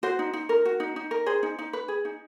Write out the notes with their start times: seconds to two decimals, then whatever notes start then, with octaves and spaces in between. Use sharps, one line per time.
0.03 F#4 C5
0.19 D#4
0.33 D#4
0.49 A#4
0.65 F#4
0.80 D#4
0.96 D#4
1.11 A#4
1.26 G#4 C5
1.43 D#4
1.59 D#4
1.73 B4
1.88 G#4
2.05 D#4